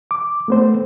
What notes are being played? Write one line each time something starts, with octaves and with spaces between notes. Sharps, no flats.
D6
A3 B3 C5